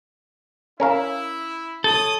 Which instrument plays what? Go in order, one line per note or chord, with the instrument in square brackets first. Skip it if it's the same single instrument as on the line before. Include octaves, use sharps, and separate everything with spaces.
[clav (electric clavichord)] C#4 A#4 F5 [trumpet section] E4
[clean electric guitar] A4 [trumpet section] C#5 D#6